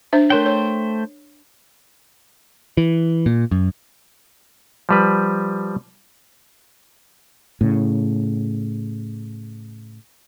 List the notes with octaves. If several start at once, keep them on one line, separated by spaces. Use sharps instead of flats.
D4 C5 E5
A3 A#4 C5 C#5 G5
C#5
E3
A#2
F#2
F3 G3 B4
A2 C#3